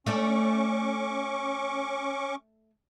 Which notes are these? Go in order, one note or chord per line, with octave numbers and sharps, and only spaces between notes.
A3 C#4 D4 A4 C#6 D6